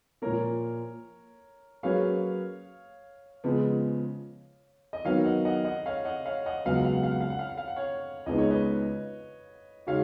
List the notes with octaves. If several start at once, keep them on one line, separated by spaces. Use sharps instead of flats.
A#2 F3 A#3 A#4 C#5
F#3 A#3 C#4 G#4 B4 C#5 F5
C#3 F3 G#3 B3
D#5
D#3 F#3 B3 D#4 C#5 F5
D#5 F#5
D#5 F#5
D#5 F#5
C#5 F5
D#5 F#5
C#5 F5
D#5 F#5
C#2 C#3 F#3 B3 F5
F#5
F5
F#5
F5
F#5
F5
F#5
F5
F#5
F5
F#5
C#5 F5
C#2 C#3 G#3 B3 D#4 D#5
C#5
B4 D#5
C#3 G#3 D#4 F#4 C#5 F5